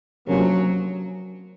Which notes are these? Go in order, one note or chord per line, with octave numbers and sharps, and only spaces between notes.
D2 C3 F3 F#3 A#3 C#4